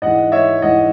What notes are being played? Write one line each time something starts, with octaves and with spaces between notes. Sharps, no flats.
G#2 E3 G#3 D#5 F#5
C#5 E5
G#2 E3 G#3 D#5 F#5